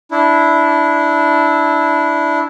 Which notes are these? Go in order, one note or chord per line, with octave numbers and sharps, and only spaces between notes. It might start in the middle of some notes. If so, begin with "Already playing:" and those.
D4 E4